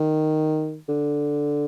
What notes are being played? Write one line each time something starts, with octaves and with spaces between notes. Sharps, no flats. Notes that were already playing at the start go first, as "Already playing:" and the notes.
Already playing: D#3
D3